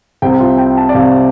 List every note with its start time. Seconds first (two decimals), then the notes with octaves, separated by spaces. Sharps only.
0.22 C2 C3 G5
0.40 F4
0.58 G5
0.77 A5
0.89 D5
0.95 C2 C3 F5